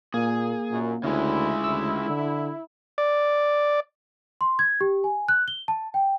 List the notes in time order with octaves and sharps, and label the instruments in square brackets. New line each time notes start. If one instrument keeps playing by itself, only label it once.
[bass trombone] A#2 [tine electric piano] A#3 [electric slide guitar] G#4
[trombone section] F#2 [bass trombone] A#2
[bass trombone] D2 [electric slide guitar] C#3 G#3 [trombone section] E4
[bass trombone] D2 [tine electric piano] E6
[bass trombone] D3
[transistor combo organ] D5
[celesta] C6
G#6
G4
G#5
F#6
G7
A5
G5